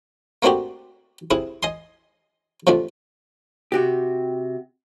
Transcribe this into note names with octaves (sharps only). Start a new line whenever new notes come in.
A3 A#3 C4 D4 F#4 G4
C3 E4 G#4
D#5 G#5 C6
C3 F3 A3 D4
C3 F#4 G4